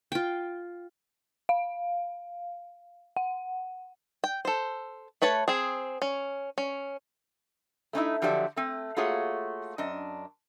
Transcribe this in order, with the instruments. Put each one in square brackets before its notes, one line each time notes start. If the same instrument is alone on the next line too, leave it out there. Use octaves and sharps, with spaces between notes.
[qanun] F4 G5
[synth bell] F5
F#5
[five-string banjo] G5
A4 C5
A3 B4 C#5 A5
C4 G#4
C#4
C#4
[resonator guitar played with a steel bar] A3 C#4 D#4 E4
D3 F3 F#3 G4 D5 E5
A3 C4
A3 A#3 F4 F#4 G#4 C#5
F#2 D4 D#5